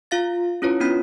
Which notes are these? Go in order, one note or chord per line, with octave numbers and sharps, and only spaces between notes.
F4 F5 A6
C#4 E4 F4 B4 C#5
B3 C#4 D4 B5